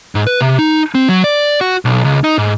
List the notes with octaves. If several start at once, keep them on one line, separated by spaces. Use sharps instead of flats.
G#2
B4
C3
D#4
C4
F#3
D5
F#4
B1
C#2
D#4
G#2